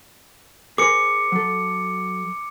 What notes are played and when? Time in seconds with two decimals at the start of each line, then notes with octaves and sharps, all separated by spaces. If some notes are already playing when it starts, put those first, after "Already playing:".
0.78 G#4 A#4 C5 D6 C#7
1.32 F#3 A4